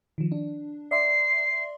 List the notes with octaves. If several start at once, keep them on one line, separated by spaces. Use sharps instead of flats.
D#3 F3
D4
D5 E5 C6 C7